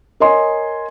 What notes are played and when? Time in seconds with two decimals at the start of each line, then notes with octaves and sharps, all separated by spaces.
0.20 A#4 C#5 D#5 G#5 C6